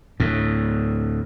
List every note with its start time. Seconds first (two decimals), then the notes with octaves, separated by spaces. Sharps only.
0.20 D2 A2